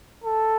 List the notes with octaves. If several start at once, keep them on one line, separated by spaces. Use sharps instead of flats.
A4